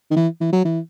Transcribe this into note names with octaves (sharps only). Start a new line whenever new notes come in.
D#3
E3
E3
F#3
E3